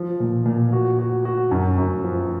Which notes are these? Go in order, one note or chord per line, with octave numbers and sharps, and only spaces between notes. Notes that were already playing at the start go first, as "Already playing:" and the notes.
Already playing: F3
A#2
A#2
F#4
F#4
F#4
F#2
F#2
F3